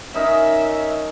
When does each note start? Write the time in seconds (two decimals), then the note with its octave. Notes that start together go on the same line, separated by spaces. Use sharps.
0.14 C#4 D#4 A#4 E5